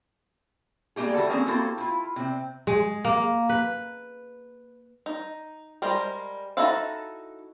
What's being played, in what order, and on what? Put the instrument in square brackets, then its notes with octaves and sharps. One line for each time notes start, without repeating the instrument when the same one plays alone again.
[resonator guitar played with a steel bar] G3 G#3 A#3 D#4 G4 G#4
E3 G3 F#4 A4
A#3 C4 C#4 G4 G#4 A#4
A#3 C4 E4 F#4 G4 A4
E4 F4
C3 C4
[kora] G#3
A#3
B4
[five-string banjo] D#4
G3 G#3 A#4 C5
D#4 E4 F#4 A4 F5